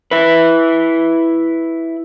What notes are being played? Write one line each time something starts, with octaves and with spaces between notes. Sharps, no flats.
E4 B4